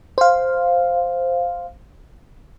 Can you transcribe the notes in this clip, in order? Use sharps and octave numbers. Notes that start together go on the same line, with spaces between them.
C5 F5